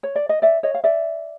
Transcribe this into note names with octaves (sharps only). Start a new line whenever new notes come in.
C#5
D5
D#5
D5 E5
C#5 D#5
F5
D5 E5